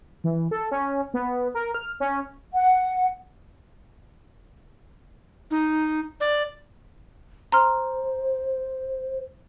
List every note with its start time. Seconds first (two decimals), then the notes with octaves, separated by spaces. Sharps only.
0.24 E3
0.51 A4
0.72 C#4
1.14 B3
1.55 A#4
1.74 F6
2.00 C#4
2.53 F#5
5.51 D#4
6.20 D5
7.52 C5 A#5 C6 F6